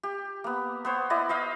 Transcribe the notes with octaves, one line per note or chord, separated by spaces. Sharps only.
G4
A#3 B3
B3 C5 C#5
E4 D5 D#5
C5 D#5 F5 B5